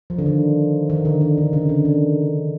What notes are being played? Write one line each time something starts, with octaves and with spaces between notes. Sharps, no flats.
F3
D3
D#3
D#3
D3
D#3
D3
C#3
D3
D#3